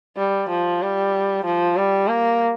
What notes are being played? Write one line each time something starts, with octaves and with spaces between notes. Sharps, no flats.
G3
F3
G3
F3
G3
A#3